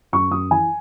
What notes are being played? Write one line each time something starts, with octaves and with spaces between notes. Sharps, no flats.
F#2 C#6
F#2 D#6
E3 G#5